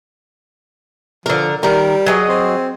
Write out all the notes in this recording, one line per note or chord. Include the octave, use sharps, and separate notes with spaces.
D3 F3 A#4
D#3 G3 A#4
F#3 G#4 D#5
C4